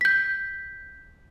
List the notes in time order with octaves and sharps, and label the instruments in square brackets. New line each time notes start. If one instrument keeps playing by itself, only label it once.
[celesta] G6 B6